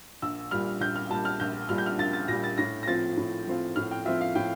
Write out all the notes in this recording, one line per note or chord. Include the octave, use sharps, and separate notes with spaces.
A#1 E6
A#2 G3 F6
A#1 G6
F6
A#2 G3 A5
F6
A#1 G6
A#2 G3 F6
G6
F6
A#1 A6
A6
A#2 G3 A#6
A6
A2 A#6
A#6
F3 C4 F4 A6
A2
F3 C4 F4
A2 F6
G5
F3 C4 F4 E5
F5
A2 G5